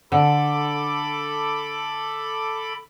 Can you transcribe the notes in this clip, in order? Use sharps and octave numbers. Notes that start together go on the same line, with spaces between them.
D3 A4 B5 D6